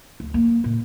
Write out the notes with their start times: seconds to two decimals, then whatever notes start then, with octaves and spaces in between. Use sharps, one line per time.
0.20 D2
0.34 A#3
0.64 A#2